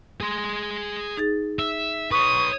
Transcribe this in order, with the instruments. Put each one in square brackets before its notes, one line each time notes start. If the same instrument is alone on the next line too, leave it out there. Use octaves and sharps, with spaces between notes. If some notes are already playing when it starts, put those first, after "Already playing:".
[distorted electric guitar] G#4 C6
[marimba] D#4 G#4 A6
[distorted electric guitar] E5
[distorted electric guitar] B4 C#5 [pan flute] C#6 [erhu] D#6